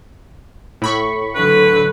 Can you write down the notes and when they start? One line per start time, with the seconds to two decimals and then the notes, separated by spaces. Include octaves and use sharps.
0.82 A2 B5 C#6
1.35 D3 F#3 B4